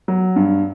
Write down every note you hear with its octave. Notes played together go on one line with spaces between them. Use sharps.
F#3
G2